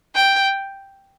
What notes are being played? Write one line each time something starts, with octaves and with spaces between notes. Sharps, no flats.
G5